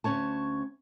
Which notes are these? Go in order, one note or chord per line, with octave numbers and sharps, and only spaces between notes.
D2 F3 C#4 C#5 A5